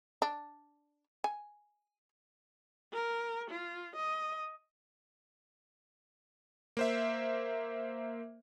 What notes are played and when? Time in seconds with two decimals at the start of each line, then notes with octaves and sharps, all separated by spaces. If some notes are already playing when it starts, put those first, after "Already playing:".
0.22 D4
1.24 G#5
2.92 A#4
3.50 F4
3.96 D#5
6.77 A#3 C5 E5